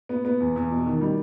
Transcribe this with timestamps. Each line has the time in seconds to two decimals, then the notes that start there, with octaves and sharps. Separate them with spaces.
0.09 B3
0.25 B3
0.40 E2
0.56 E2
0.71 B2
0.86 D#3
1.01 G3